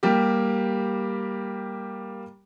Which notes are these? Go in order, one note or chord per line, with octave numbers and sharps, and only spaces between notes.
G3 A#3 G4